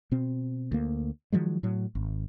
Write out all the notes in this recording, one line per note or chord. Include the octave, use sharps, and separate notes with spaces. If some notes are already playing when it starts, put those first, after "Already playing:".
B2 C4
D2 A#3
D#3 F3 F#3 G#3
A2 F#3
G#1